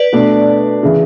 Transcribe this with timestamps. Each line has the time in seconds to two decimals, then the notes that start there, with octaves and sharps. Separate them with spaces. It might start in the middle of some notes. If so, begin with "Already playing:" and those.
Already playing: B4 D5
0.12 B2 A3 D4
0.83 C#3 E3